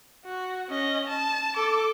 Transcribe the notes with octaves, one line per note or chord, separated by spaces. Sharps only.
F#4
C#4 D#5
A5
A4 D6